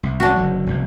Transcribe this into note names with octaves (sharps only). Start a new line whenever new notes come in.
C2
D4 F#4
F#1 D3 F#3
F1 C2